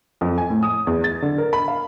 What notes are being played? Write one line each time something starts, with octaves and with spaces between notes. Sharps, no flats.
F2
G#5
A2
D#6
E2
A6
D3
A#4
B5
F5